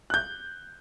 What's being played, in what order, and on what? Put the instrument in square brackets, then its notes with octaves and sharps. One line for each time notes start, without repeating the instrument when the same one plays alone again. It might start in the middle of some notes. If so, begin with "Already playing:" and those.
[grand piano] F#6 G6